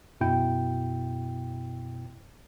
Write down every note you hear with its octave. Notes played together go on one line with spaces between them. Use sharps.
F#2 B2 E4 G5